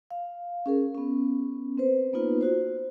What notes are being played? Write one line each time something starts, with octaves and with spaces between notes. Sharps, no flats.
F5
C#4 G#4 A#4
B3 C#4
C4 B4 C5
A#3 B3 D#4 F4 B4
F4 F#4 C5